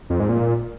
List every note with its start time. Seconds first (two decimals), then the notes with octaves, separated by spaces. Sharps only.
0.10 F2
0.20 G#2
0.29 A#2